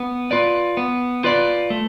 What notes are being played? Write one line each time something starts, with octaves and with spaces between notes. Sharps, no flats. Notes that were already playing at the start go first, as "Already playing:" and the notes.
Already playing: B3
F4 B4 D5
B3
F4 B4 D5
A3